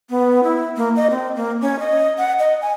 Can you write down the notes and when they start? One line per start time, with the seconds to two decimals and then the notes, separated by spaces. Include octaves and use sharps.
0.10 B3
0.43 E4
0.77 A#3
0.96 D#5
1.10 C4
1.36 A#3
1.61 C#4
1.79 D#5
2.18 F#5
2.39 D#5
2.62 G#5